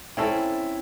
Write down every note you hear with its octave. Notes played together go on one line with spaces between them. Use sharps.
C4 C#4 E4 A4